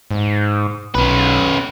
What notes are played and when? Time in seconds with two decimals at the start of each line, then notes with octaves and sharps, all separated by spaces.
0.11 G#2
0.95 B1 C#4 B4